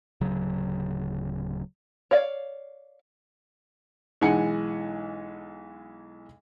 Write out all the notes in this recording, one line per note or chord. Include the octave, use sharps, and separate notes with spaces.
D1 C#3 F#3
C#5 D5 F5
B1 E3 G#3 F#5 G#5 C#7